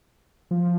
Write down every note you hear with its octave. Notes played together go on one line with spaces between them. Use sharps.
F3